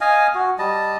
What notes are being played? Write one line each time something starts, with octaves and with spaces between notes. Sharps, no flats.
D#5 F5 G#5
F#4
G3 D#5 A5